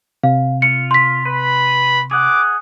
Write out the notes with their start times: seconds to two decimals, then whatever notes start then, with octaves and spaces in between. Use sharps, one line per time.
0.24 C3 F5
0.62 F4 C#7
0.91 C6 B6
1.25 B4 B5
2.11 G#4 F#5 D6